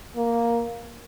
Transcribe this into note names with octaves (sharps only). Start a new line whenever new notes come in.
A#3